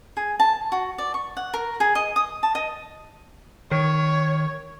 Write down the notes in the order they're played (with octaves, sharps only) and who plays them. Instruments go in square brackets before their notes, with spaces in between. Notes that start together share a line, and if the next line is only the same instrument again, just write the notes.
[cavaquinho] G#4
A5
F#4
D5
C#6
F#5
A#4
G#4
D#5
D#6
A5
D#5
[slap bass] D#3 [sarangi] C#5